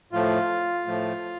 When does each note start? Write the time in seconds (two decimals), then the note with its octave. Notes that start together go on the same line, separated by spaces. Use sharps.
0.12 A2 F3 A3 F4
0.86 A2 F3 A3